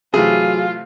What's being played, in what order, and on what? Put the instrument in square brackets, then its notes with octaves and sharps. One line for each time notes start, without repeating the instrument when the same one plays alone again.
[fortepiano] C3 E3 A3 [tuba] F#3 [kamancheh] F4 [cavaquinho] G#4